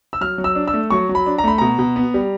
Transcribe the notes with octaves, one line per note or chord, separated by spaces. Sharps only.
E6
F#3 F6
F#3
E6
D4
E6
A3
F#3 C#6
F#3
B5
D4
A#5
A3 B5
B2 A#5
B2
B3
G3